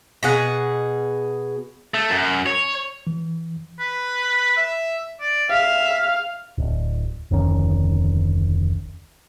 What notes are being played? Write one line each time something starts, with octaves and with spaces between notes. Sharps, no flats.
B2 G#4 F#5
A3
F#2
C#5
E3
B4
E5
D5
E5 F5
D1
F1 D2 D#3 C#4